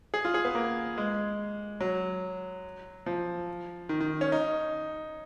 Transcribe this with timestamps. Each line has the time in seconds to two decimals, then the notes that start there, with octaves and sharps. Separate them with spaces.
0.14 G#4
0.25 F4
0.34 G#4
0.45 B3
0.55 A#3
0.98 G#3
1.81 F#3
3.06 F3
3.89 D#3
4.00 D#3
4.21 C#4
4.32 D#4